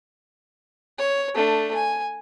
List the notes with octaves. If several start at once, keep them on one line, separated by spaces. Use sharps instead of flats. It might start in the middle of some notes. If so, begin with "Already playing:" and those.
C#5
A3 D4
G#5